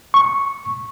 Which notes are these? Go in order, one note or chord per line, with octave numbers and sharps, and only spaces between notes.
C#6